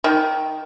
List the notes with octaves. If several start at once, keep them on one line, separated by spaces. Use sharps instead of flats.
D#3